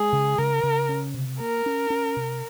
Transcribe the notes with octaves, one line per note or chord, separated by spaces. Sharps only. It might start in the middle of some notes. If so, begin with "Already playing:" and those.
Already playing: G#3 G#4
C#3
C#3 A#4
C#3
C#4
C3
A#3 A#4
C#4
C#4
C3